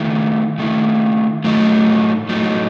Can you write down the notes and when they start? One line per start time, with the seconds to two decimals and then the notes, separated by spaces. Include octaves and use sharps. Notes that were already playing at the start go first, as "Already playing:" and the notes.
Already playing: D#3 A3 E4
0.58 D#3 A3 E4
1.44 A2 F#3 A3 D#4
2.29 A2 F#3 A3 D#4